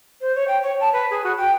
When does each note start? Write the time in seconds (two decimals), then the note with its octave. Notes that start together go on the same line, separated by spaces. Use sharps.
0.21 C5
0.35 C#5
0.47 G5
0.62 C#5
0.80 A5
0.93 B4
1.10 G#4
1.24 F#4
1.37 G5